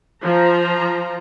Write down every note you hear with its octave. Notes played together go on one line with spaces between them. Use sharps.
F3 A#5